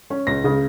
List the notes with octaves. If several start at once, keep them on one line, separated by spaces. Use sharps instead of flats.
C#4
C#2 A#6
C#3